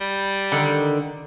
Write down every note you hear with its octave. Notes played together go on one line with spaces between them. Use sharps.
G3
D3 D#3